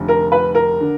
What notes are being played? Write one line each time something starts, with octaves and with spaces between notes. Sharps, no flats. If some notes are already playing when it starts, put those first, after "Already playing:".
Already playing: F1 D3
A#4
B4
A#4
D3